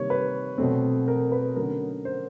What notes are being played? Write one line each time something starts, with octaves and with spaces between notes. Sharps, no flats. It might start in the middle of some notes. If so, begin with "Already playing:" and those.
Already playing: C3 D#3 G3 A#3 C#5
B4
B2 F#3 A3 C4
A#4
B4
D3 F#3 A3 C#4 A#4
C5